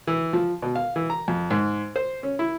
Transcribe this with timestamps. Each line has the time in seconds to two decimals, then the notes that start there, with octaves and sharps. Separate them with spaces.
0.07 E3
0.33 F3
0.63 B2
0.75 F5
0.96 E3
1.10 A#5
1.28 F2
1.51 G#2
1.96 C5
2.23 C#4
2.39 E4